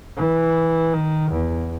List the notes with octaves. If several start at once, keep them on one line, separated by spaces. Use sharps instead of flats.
E3
D#3
E2